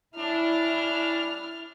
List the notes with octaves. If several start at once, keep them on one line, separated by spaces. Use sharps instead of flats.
G3 C#4 D4 E4 F6